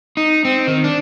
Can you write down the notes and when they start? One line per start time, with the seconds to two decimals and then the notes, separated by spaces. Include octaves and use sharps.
0.17 D#4
0.45 C4
0.67 D#3
0.84 D4